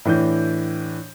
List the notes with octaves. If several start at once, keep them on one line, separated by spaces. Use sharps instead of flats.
A2 E3 D4 G6